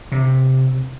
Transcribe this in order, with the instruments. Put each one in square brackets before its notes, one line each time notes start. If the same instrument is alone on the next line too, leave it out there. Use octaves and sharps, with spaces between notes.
[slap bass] C3